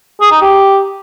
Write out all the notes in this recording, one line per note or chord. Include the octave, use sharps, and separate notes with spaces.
G#4
D#4
G4